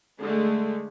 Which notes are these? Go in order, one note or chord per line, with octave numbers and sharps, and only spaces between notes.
D3 G#3 A3